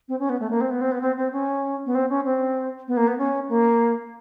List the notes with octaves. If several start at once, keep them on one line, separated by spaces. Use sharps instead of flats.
C4
C#4
B3
A3
A#3
C4
B3
C4
B3
C4
C4
C#4
B3
C4
C#4
C4
B3
A#3
B3
C#4
A#3